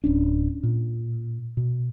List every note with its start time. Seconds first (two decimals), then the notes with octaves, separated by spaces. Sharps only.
0.04 D1 C#4 D4
0.63 A#2
1.57 B2